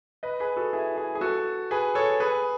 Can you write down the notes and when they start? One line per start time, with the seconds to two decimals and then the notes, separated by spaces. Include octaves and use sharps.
0.23 B4 D#5
0.40 G#4 B4
0.56 F#4 A4
0.73 E4 G#4
0.97 E4 G#4
1.15 G#4
1.21 F#4 A4
1.71 G#4 B4
1.95 A4 C#5
2.20 G#4 B4